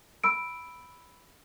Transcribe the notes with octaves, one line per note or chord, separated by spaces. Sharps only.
B5 E6 D7